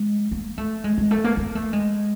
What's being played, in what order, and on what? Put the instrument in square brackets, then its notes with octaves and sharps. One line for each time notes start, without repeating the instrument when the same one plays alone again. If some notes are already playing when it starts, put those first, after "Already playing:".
Already playing: [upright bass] G#3
A#3
A3
G#3
G#3
A3
A#3
A#3
A3
G#3